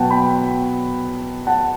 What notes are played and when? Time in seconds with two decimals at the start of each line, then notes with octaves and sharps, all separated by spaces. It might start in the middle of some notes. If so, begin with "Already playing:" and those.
Already playing: B2 F#3 B3 F#5 G5 A5
0.10 G5 B5
1.47 F#5 A5